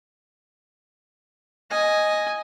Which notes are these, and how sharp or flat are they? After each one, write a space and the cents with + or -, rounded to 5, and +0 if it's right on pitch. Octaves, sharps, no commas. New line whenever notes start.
D#5 +0 G#5 +0